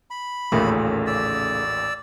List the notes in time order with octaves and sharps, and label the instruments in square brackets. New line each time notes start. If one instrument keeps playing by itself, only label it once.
[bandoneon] B5
[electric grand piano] A1 D#2 A#2 [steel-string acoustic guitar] C#3 A3 A#3
[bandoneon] D5 E6